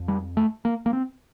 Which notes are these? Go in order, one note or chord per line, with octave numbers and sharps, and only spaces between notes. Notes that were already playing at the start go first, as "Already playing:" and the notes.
Already playing: F2
G3
A3
A#3
A#3
C4